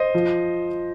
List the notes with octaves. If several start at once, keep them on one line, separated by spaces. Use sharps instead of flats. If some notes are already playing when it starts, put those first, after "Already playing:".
Already playing: C5 D#5
F3